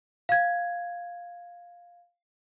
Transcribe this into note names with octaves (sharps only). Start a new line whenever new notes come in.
F5 G#6